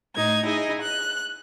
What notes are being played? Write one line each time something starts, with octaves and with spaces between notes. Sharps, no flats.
A2 D#4 G#6
D#4 E4 G#4 D#5
F#6